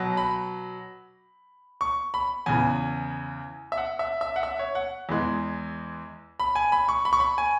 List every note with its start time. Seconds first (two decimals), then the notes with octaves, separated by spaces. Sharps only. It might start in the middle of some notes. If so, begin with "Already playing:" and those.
Already playing: B2 F#3
0.17 B5
1.81 C#6
2.14 B5
2.46 E2 C#3 E3 G#5
3.72 E5
3.78 F#5
3.99 E5
4.21 E5
4.36 F#5
4.43 E5
4.59 C#5
4.75 F#5
5.09 E2 E3 G#3
6.40 B5
6.56 G#5
6.72 B5
6.89 C#6
7.05 B5
7.13 C#6
7.20 B5
7.38 G#5